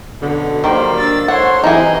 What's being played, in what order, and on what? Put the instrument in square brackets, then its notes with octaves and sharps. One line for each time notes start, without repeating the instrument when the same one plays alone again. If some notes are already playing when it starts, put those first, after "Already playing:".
[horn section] F#2 B2 D3
[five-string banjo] D#3 [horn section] F#3 G3 A#3 [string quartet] C5
[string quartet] D4 E6 A6
[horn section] A4 C#5 [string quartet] C5 C6 [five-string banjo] F#5
[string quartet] C3 F#3 D#5 [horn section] E3 [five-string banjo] D#4 E4 G#4